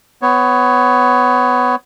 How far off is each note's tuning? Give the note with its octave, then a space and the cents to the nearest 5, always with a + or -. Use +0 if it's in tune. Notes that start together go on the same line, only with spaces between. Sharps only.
B3 +20 C#5 +0